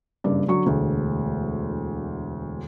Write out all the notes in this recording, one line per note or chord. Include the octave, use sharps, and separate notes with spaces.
F#1 G2 D5
D3 F#3 C#6
E1 D2